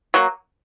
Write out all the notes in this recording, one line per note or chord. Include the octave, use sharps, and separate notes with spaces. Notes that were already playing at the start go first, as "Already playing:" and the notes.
F#3 A#3